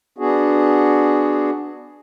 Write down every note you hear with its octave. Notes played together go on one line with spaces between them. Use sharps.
B3 D4 F#4 G#4